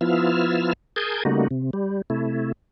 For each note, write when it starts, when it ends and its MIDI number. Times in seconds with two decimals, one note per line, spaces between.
0.01 0.73 53
0.01 0.73 59
0.01 0.73 64
0.01 0.73 65
0.01 0.73 88
0.01 0.73 89
0.96 1.23 68
0.96 1.23 70
0.96 1.23 81
0.96 1.23 87
0.96 1.23 91
0.96 1.23 92
1.25 1.48 49
1.25 1.48 55
1.25 1.48 57
1.25 1.48 58
1.25 1.48 63
1.25 1.48 66
1.51 1.71 48
1.73 2.02 55
2.10 2.52 48
2.10 2.52 57
2.10 2.52 64